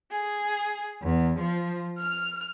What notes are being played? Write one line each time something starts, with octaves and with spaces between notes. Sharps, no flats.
G#4
E2
F3
F6